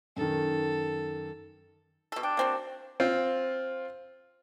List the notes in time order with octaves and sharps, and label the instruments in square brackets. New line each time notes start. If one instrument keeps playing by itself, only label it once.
[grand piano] F#2 D#3 [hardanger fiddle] A4
[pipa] B2 A4
[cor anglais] D4 [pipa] G5
[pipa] A#3 C4 F#4
[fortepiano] C4 F4